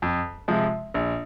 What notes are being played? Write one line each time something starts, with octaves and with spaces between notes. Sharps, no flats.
F2
C3 F3 G#3
A#1